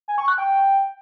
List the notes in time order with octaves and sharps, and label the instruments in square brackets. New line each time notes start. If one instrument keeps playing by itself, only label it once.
[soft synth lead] G#5
C#6
F#6
G5